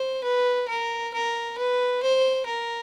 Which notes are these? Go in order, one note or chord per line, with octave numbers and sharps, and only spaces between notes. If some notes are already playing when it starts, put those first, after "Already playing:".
Already playing: C5
B4
A#4
A#4
B4
C5
A#4